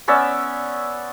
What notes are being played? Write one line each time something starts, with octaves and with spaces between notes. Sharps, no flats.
B3 C#4 D5 E5